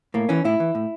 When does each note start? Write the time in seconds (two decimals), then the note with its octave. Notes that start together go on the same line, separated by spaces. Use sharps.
0.14 A2 A#3
0.29 E3 C#4
0.44 A2 E4
0.60 E3
0.75 A2